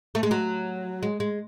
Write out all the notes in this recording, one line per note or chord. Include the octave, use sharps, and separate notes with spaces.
A3
G#3
F#3
G#3
G#3